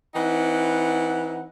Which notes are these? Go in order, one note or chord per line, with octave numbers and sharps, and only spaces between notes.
E3 C4 D#4 F#5